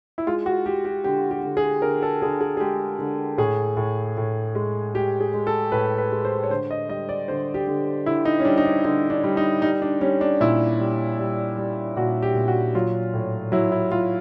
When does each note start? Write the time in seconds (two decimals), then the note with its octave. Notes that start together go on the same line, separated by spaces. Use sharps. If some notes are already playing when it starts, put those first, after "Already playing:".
0.18 E4
0.27 G#3 F4
0.46 F#4
0.66 G#3 G4
0.85 G4
1.04 D3 G4
1.31 G4
1.43 D3
1.57 G#4
1.82 D3 A#4
2.03 A4
2.22 D3 G#4
2.41 G#4
2.57 G#4
2.60 G#3 G4
2.99 D3
3.38 A2 G#4
3.77 A2
4.17 A2
4.55 G#3
4.95 G#3 G4
5.20 G#4
5.34 G#3
5.47 A4
5.72 A2 B4
5.98 B4
6.12 G#3
6.25 C5
6.43 C#5
6.50 D3 C5
6.71 D#5
6.89 G3 D#5
7.09 D5
7.28 D3 C5
7.54 G4
7.67 D3
8.06 D3 E4
8.25 D#4
8.40 C#4
8.45 G3 D4
8.58 D#4
8.65 D4
8.84 D3 D#4
9.10 D4
9.24 G3
9.37 D#4
9.62 G3 D#4
9.82 D4
10.01 G3 C#4
10.21 D4
10.40 A#2 E4
10.80 G3
11.18 G3
11.57 G3
11.96 A#2 F#4
12.22 G4
12.35 A#2
12.48 F#4
12.75 F#3 F4
13.14 A2
13.52 F#3 E4
13.72 E4
13.91 F#3 F4